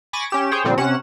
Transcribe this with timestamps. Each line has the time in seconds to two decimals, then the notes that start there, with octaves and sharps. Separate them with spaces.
0.13 G#5 B5 C#6 D6 A6 A#6
0.30 C#4 G4 E7
0.52 G#4 C5 C#5 G5
0.64 A#2 D3 F3 G3 C4
0.77 C3 C#4 F#5 E7